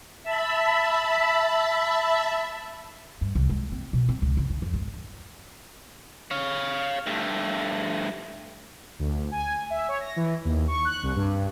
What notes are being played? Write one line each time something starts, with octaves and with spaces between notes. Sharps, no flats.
E5 A5 B5
G2
C2
G#3
C4
B2
C4
C#2
C#3
D3
F2
G#1
C#5 F5
G2 A3
D2
G#5
E5
C#5
A#6
E3
D#2
C#6
F#6
C2
G2